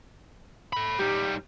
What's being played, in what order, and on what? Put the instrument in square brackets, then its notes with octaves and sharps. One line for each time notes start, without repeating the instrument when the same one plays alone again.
[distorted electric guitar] A4 B5
[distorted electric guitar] G3 D#4 [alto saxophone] G4